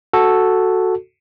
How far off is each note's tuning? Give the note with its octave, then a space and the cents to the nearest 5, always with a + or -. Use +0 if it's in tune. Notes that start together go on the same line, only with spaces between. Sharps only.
F#4 +0 A4 +0